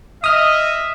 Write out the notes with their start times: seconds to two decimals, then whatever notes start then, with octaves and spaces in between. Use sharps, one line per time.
0.24 D#5 E5 D#6 F6